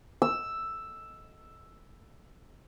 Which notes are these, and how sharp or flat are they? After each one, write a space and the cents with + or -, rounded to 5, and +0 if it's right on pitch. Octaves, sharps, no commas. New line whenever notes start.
E6 +5